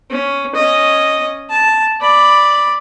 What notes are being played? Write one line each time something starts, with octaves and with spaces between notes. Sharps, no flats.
C#4
C#4 D#5
A5
D5 B5